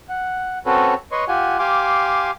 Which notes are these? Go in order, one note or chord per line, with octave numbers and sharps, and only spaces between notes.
F#5
C4 C#4 F#4 A4 B4 C#5
B4 C#5 D#5 C6 C#6
F4 G4 F#5 G#5
G4 F5 G#5 C6 D6